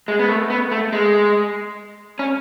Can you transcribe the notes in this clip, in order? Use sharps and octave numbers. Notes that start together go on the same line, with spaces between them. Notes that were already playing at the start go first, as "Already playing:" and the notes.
G#3
B3
A3
B3
A3
G#3
C#4